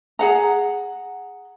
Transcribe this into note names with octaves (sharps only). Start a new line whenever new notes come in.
G#4 F#5 A#5